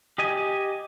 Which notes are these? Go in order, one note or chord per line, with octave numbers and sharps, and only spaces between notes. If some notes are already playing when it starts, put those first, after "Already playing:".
G4 D#5 G#5